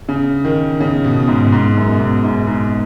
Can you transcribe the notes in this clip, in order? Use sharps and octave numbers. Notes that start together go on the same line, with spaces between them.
C#3
D#3
C#3
B2
G#2
B2
G#2
F#2
B2
G#2
G#2
G#2